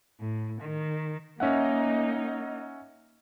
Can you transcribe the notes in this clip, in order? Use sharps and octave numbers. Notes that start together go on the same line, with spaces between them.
A2
D#3
A#3 C#4 D#4 E5 F#5